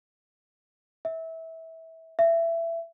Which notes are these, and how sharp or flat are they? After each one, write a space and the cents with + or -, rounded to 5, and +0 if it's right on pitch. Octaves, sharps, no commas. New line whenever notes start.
E5 -20
E5 +20